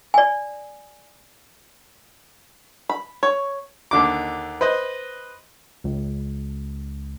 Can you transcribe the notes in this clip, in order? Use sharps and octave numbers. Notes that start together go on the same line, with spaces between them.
D5 G#5
B5
C#5
D#2 D3 D6
B4 C5 D#5
C#2